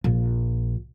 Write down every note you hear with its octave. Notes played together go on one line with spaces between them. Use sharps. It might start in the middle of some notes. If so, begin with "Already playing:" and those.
A#1